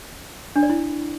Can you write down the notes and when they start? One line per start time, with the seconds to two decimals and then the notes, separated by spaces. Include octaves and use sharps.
0.56 D4
0.63 D5
0.70 E4